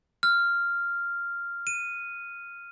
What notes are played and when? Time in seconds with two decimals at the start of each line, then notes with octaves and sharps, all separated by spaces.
0.23 F6
1.67 D#7